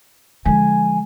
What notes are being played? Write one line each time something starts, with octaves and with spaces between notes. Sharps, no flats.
D3 F3 G#3 G#5